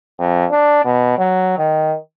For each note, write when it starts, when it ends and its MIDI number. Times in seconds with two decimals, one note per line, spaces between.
0.19 0.45 41
0.51 0.82 62
0.85 1.16 47
1.18 1.56 54
1.58 1.95 51